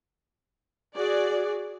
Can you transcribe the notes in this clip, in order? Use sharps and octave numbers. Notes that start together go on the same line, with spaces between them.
F#4 G#4 D5